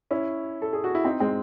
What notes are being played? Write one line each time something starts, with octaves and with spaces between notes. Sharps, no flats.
C#4 E4
A4
G#4
F#4
E4
C4 D#4
G#3 C4